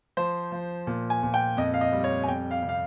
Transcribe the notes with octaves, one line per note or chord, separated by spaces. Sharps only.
F3 C5
F3
A#2
G#5
A#2
G5
F2 D#5
F5
D#5
G3
C#5
G#5
F2 G5
F5
C3
F5